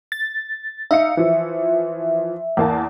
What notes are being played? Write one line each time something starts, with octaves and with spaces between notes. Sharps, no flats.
A6
D#4 E5 F5 C#7
E3 F3
E2 A#3 A5